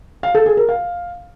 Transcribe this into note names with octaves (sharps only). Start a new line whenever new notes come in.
F5
A4
G#4
A#4
F5